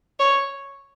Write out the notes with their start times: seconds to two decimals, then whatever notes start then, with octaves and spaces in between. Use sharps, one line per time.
0.19 C#5